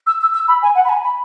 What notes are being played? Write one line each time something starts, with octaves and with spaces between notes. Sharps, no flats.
E6
E6
E6
B5
G#5
F#5
B5
G#5
B5